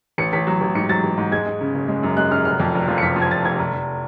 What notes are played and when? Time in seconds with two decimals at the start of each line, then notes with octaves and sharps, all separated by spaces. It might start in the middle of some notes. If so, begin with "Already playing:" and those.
0.18 A1 C#7
0.33 A1 B6
0.47 F#3
0.61 A1
0.75 G#2 C#7
0.89 F#3 A6
1.04 A1
1.18 G#2
1.32 G#3 G#6
1.46 G#3
1.61 C#3
1.75 F#1
1.88 G#3
2.03 F#2
2.17 G#3 F#6
2.31 F#2 F6
2.45 F1 F6
2.60 F2
2.74 F1
2.88 F3
2.98 C#7
3.02 F1 B6
3.16 F3
3.22 G#6
3.31 F1 A6
3.45 F1 G#6
3.59 F1
3.73 F1